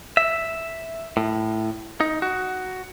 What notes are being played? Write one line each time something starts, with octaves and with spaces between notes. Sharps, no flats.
E5
A2
D#4
F#4